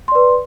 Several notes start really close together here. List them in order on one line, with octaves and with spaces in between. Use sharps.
C6 D5 B4